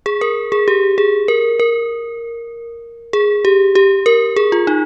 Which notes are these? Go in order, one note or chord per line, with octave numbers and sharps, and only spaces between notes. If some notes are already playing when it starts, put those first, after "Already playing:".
G#4
A#4
G#4
G4
G#4
A#4
A#4
G#4
G4
G4
A#4
G#4
F4
D#4